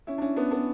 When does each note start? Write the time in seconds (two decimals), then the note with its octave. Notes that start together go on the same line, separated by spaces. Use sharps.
0.07 C#4 E4
0.18 D4
0.22 C#4 E4
0.36 B3 D4
0.51 B3 D4